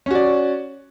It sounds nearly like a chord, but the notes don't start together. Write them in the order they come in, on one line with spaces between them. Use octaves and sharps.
C#4 F#4 D5